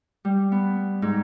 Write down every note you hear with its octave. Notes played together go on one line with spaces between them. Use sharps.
G3
B3
G#2